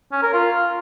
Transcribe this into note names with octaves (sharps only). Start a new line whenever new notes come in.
C#4
A#4
F4